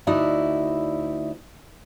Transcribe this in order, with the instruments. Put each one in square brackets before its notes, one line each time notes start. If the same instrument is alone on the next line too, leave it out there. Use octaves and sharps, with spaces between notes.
[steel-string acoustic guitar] D2 D#4 E4 F#4 D5